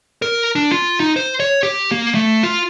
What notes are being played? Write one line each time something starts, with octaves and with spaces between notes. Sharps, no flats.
A#4
D4
F4
D#4
C5
C#5
G4
A#3
A3
F4